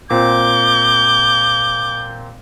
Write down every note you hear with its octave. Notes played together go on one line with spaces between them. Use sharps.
A#2 C4 D6 G6